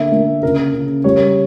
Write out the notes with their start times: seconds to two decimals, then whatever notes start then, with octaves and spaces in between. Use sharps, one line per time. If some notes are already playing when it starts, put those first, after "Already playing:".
Already playing: D3 A#3 E5
0.12 A#3
0.43 C#3 A#4
0.74 C#3
1.04 G3 C#5